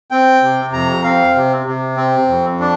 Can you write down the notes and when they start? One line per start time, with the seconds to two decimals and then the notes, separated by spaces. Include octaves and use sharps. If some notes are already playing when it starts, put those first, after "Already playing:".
0.11 C4 G5
0.42 C3
0.73 F2 A#5
1.04 C4 F5
1.35 C3
1.66 C3
1.97 C4
2.28 F2
2.60 D4